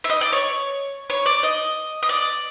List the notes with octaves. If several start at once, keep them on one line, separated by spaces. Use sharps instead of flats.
E5
D#5
D5
C#5
C#5
D5
D#5
D#5
D5